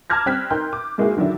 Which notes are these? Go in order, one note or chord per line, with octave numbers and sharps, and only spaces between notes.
A5 A#5 D6 F6 G#6 A#6
G3 C4 F#6 B6
D#4 A#4 G5 A#5 C6 G6
D6
G#2 G#3 A#3 E4 F#4 G#4
D3 D#3 F#3 D4 E4